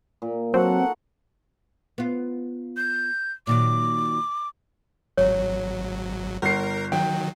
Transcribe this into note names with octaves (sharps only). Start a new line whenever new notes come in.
A#2
F#3 C4 D#4 F#4 A4 F#5
B3 F4
G6
A#2 D#3 F#3 D6
G#1 F#3 C#5
G1 A#4 C7
D#3 F#3 G5